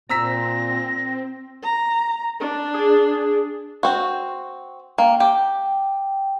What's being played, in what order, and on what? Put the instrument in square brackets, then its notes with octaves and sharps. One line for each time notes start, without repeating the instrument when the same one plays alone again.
[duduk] A#2 [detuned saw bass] C4 [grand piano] A#5 E6 B6 [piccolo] A#6
[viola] A#5
D4
[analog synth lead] G#4
[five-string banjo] C4 F#4
[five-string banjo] A#3 [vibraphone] G5
[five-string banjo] G4 [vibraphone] G5